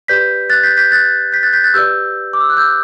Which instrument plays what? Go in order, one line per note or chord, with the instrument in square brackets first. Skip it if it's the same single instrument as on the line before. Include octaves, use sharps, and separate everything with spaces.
[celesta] G4 B4 D5 G6 B6
F#6 A6
G6 B6
G6 B6
F#6 A6
G6 B6
F#6 A6
G6 B6
F#6 A6
G4 B4 D5 E6 G6
D6
E6
F#6
E6 G6